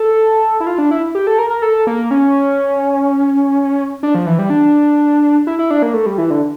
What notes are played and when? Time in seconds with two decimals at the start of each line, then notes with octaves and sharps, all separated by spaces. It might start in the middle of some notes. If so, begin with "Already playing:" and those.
Already playing: A4
0.60 E4
0.67 F4
0.78 D4
0.91 E4
1.15 G4
1.27 A4
1.39 A#4
1.50 A#4
1.62 A4
1.87 A#3
2.11 C#4
4.03 D4
4.15 F3
4.26 E3
4.39 G3
4.50 D4
5.47 E4
5.59 E4
5.71 D4
5.82 A#3
5.94 A3
6.06 G3
6.18 E3
6.30 D3